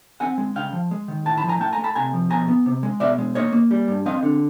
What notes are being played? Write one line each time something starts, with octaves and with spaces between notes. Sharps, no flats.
C4 F#5 G#5
G#3
C#3 F5 G5
F3
G#3
D#3
A2 G5 A5
A5 B5
F3
G#5 A#5
A3 G5 A5
G#5 A#5
A3
A5 B5
C3 G#5 A#5
F3
B2 G#5 A#5
B3
C3
G#3
B2 D5 E5
G#3
A#3 C#5 D#5
A#3
G3
G2
C4 D#5 F5
D3